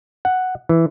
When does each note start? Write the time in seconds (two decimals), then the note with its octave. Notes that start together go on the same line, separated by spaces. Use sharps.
0.25 F#5
0.69 E3